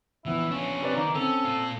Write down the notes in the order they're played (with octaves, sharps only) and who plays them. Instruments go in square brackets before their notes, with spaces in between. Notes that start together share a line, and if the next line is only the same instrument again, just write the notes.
[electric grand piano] A#1 B3 [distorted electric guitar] E3 [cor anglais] E4
[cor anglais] C#4 [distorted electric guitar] D4 F4
[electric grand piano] C3 B4 D5
[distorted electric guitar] D#3 [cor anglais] A#3 [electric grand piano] D#4
[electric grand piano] C4 [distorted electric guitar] C#4 [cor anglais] A4
[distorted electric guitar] A#2 F4